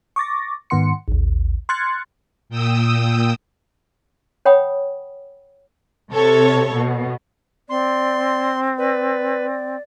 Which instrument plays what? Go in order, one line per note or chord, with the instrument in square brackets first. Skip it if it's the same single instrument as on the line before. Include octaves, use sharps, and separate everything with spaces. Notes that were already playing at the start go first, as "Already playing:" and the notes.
[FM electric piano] C#6 D6 A6 A#6
G#2 D#3 B3 F#5 C6 C#7
A1 D#2
C6 F6 F#6 G#6 A6 C#7
[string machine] A#2 G5 D#6 E6
[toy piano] C#5 F#5 G5 B5 D#6
[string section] C3 A4 C#5
B2
[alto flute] C4 [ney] D5 [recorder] C6
[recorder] B4 [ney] D5